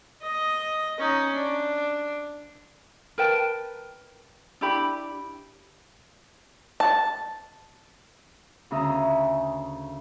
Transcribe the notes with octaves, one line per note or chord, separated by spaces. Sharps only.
D#5
C#4 D#4
D4
A#4 B4 G5 A5
D4 E4 G4 B5
A5
D2 C#3 G#4 E5 A#5 D#6